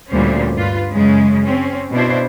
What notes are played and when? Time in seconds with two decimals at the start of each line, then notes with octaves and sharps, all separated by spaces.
0.10 D2 A#2 D3 G3 C#4 C5
0.55 G2 F4 B4
0.92 F#2 C#3 G#3
1.46 C4 C#4
1.92 B2 D4 E4 C5